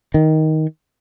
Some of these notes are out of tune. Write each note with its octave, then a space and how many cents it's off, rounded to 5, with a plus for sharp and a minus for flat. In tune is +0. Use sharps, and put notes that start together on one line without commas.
D#3 +10